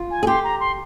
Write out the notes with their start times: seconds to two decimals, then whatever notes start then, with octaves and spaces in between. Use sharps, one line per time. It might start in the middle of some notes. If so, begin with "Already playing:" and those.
Already playing: F4
0.11 G#5
0.23 G#4
0.27 G4 C6
0.44 A#5
0.60 C6